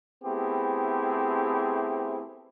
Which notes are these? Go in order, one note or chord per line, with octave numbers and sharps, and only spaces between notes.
A3 B3 C4 E4 G4 G#4